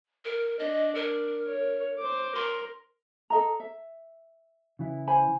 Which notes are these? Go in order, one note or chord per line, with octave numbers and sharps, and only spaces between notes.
A#4
D4 D#5
A#4
C#5
C5 D6
A#4 C6
A4 D#5 A#5
E5
C#3 E3 E4
C5 G#5 B5